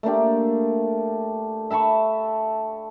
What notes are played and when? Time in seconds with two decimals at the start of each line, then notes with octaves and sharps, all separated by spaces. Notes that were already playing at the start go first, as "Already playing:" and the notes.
0.03 A3 A#3 D4 G4
1.70 E5 A5 B5 C#6